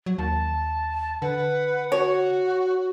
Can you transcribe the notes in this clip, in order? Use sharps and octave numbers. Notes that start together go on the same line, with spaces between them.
F#3
D#2 A5
D3 B4 F#5
F#4 C#5